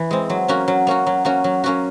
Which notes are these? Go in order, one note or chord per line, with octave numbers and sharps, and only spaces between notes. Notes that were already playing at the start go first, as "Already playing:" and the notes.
Already playing: E3
G#3 C4
F#3
A#3 C#4 F#4
F#3
A#3 C#4 F#4
F#3
A#3 C#4 F#4
F#3
A#3 C#4 F#4